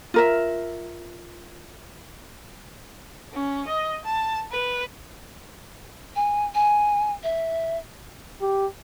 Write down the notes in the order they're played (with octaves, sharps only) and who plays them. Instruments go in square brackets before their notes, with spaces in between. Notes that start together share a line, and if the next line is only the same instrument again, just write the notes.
[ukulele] F4 A#4 E5
[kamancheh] C#4
D#5
A5
B4
[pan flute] G#5
G#5
E5
[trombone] G4